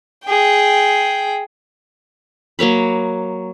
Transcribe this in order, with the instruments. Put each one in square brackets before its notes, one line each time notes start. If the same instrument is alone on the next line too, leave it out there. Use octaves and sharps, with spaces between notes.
[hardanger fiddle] G#4 G5
[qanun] F#3 A#3 C#5 B5